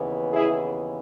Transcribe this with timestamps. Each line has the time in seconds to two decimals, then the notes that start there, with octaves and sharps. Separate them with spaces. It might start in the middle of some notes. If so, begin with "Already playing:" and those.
Already playing: D#2 C#3 E3 B3
0.33 E4 G#4